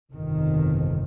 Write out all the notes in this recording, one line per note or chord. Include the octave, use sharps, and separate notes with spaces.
G1 F2 C3 D#3